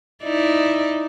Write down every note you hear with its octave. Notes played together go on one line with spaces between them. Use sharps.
D#4 E4 D5